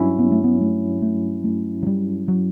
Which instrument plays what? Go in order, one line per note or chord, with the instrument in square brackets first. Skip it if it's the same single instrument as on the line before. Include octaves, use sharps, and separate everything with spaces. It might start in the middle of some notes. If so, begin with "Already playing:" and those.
Already playing: [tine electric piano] G2 F#3 C#4 E4
[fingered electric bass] B3
A3
B3
A3
A3
A3
F#3
G3
F#3